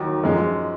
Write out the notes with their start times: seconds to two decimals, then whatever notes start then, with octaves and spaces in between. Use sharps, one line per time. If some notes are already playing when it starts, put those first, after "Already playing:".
Already playing: D#2 D#3 F#3
0.23 F#2 F3 G#3